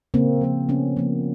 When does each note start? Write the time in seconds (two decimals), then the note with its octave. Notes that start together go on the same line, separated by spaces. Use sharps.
0.14 C#3 A#3 C4
0.41 F3 A#3
0.69 C#3 B3 C#4
0.97 F3 A#3